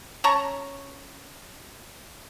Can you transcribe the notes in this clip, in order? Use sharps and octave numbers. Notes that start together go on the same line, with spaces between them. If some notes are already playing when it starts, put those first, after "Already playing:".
C#4 A5 A#5 C#6